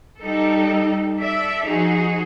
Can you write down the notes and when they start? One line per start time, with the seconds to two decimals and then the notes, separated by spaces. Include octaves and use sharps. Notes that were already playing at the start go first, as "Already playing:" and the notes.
0.19 G3 D#4 A4
1.20 A4 D5 E5
1.66 F3 D#4 F#4 G#4